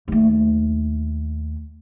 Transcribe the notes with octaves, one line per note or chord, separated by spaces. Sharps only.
D#2 A3